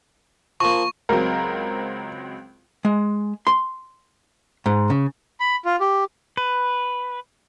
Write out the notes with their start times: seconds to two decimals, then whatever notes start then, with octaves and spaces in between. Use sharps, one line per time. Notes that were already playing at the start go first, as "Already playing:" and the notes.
0.60 F3 A#3 C#6
1.09 C#2 F#3 C4 A#4
2.85 G#3
3.47 C6
4.66 G#2
4.90 C#3
5.40 B5
5.65 F4
5.80 G4
6.37 B4